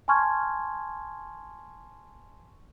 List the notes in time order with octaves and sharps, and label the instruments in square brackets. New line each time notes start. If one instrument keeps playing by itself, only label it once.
[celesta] G#5 A5 C6 C#6 F6 G#6